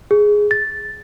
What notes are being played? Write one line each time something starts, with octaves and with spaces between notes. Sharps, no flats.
G#4
A6